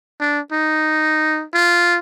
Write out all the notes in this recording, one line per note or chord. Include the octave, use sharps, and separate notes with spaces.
D4
D#4
F4